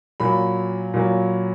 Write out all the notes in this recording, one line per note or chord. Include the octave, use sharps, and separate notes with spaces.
A#2 F#3 B5
A#2 F#3